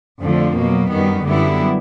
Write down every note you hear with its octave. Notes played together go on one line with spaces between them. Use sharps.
F2 D3 F3 A3
B2 F#3 A#3
F#2 D#3 G3 B3
F#2 D3 G3 B3 E4